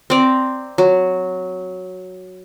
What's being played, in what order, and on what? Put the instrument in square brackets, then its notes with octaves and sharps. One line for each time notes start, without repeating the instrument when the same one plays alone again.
[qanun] C4 D5 A#5
F#3